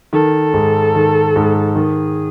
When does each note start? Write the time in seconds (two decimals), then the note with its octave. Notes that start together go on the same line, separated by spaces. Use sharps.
0.13 D#3 A4
0.54 G#2
0.95 D#3
1.36 G#2
1.75 D#3 G#4